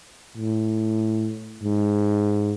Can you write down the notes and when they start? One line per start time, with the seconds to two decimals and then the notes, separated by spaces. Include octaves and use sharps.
0.37 A2
1.63 G#2